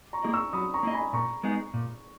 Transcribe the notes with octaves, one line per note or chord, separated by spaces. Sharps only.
A#5 C#6
A#3 E4 G#4 D#5
C#6 E6
F#3 B5 D#6
A#5 C#6
A#3 E4 G#4 D#5
G#5 B5
A#2 A#5 C#6
G#3 B3 D#4 G#4
A#2